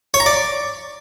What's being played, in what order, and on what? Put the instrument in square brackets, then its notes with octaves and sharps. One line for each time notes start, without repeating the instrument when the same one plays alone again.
[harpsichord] C#5
A#5
D5